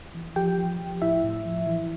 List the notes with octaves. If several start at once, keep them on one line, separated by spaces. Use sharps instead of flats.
E3
F3 G4 G5
F3
F3
A2 E4 E5
A2
F3
E3